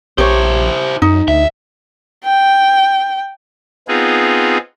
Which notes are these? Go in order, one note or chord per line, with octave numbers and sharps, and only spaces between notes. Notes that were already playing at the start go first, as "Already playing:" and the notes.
A#1 E4 G4 C5 C#5
F#2 D#4
D2 E5
G5
B3 C4 D#4 F4 G#4